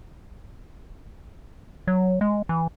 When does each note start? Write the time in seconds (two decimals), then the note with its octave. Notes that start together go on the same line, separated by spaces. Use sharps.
1.87 F#3
2.21 G#3
2.49 E3